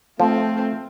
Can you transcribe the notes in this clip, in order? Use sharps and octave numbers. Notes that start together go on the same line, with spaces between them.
F3 A3 C4 F4